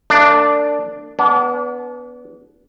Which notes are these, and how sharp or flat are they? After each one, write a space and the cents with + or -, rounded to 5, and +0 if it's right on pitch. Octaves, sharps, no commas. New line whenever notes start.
A3 +45 D4 +0
B3 +0 D4 -35